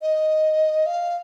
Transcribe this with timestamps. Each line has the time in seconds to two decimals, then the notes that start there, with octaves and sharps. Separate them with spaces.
0.02 D#5
0.86 F5